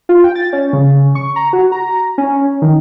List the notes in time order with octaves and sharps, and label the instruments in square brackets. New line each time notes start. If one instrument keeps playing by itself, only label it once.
[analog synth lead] F4
G5
A6
C#4
C#3
C#6
A#5
F#4
A#5
C#4
D#3